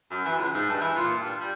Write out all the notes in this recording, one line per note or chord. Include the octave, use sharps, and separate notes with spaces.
F#2
E3
C#2
G#2
G2
E3
A#2
G2
G3